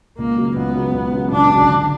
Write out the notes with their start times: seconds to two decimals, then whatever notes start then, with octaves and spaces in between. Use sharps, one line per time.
0.18 C#2 A#3
0.37 C#3 F#3
0.56 C#2 B3
0.75 C#3 F#3
0.94 C#2
1.12 C#3 F#3
1.32 C#2 D4
1.50 C#3 F#3
1.69 D3